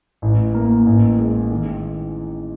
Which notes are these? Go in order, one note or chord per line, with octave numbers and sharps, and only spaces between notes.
A1
A#3
A1
G#3
D#3